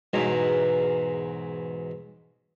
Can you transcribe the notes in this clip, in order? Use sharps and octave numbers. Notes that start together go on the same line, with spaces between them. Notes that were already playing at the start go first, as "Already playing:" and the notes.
E2 G#2 B2 F#3